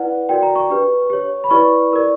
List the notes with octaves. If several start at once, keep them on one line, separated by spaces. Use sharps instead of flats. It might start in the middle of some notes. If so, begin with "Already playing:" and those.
Already playing: E4 B4 D5 F#5
F#4 A#4 D5 G5
A#5
C#6
D4 G4 B4
G4 C#5
B5
E4 G4 B4 D5 C#6
E4 A#4 D5